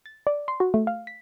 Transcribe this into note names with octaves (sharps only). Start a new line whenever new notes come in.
A6
D5
C6
F#4
A3
F5
B6